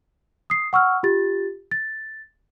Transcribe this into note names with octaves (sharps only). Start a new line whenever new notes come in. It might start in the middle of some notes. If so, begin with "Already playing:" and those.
D#6 C7
F#5 C#6 E6 F6
F4 G4 A6
A6